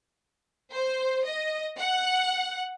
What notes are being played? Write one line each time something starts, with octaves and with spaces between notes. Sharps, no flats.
C5
D#5
F#5